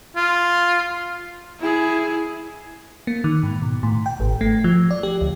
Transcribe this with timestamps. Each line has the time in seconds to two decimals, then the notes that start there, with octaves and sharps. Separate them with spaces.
0.16 F4
1.60 E4 G#4
3.07 A#3
3.24 D#3
3.43 G#2
3.62 B2
3.83 A2
4.06 G5
4.20 G#1
4.41 A3
4.64 F3
4.91 D5
5.03 G4
5.21 D2